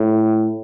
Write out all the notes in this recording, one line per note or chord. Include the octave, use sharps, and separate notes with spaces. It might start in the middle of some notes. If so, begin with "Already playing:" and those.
Already playing: A2